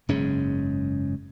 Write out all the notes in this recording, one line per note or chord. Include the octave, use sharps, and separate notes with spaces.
F#1 G#2 G#3 C#4